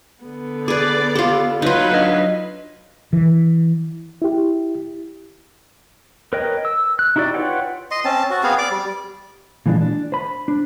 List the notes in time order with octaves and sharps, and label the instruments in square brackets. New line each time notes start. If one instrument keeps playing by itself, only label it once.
[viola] D3 B3
[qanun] G#4 B4 [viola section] D5 [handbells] D6 A6
[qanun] F4 A4 [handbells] G4
[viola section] F#3 B4 [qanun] D#4 F4 [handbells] C5
[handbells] D4 D#5 F5
[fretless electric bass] E3
[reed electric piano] E4 G4
[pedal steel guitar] A#4 B4 C#5 D#5 G5
E6
F#6
D#4 E4 F#4 G4 D5
F4 B4 C#5 F#5 G5
[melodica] D#5 C6
C4 C#4 A5
F#4
B3 C4 G#4 F5
D5 D6
G3
[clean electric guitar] A#2 E3 F3 G#3 D4
D4
C5 B5
D4